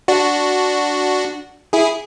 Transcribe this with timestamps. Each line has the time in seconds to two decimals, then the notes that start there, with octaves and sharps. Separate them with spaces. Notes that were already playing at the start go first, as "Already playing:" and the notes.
0.08 D4 F#4
1.73 E4 G#4